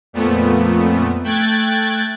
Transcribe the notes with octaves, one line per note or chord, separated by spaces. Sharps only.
F2 A#2 A3 B3
A3 G5 F#6 G#6 A6